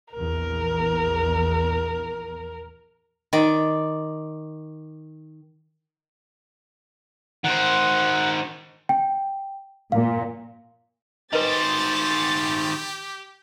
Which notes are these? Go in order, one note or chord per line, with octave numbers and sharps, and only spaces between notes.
A#1 E2 A#4
D#3 D5
D#3 C5 F#5
G5
A#2 F5
D#3 G4 B4 C5 D#5 A6